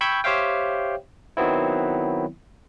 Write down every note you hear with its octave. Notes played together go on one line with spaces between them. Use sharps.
G5 B5 C#6 E6 G6 G#6
G4 C5 C#5 E5 F5 G5
D#3 F#3 B3 C4 E4